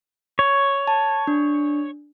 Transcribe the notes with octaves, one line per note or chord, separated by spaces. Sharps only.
C#5
A5
D4